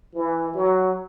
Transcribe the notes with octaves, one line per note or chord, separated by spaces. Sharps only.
E3
F#3